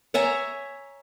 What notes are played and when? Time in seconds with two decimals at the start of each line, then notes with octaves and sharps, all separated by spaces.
0.14 C#5 E5 G#5 A#5